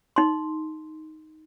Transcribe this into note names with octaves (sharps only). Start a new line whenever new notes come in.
D#4 C6